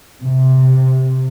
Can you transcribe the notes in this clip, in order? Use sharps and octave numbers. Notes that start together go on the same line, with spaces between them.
C3